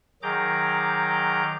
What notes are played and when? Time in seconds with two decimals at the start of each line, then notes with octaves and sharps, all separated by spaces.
0.22 D#3 F#3 G#4 A#5 D6 G6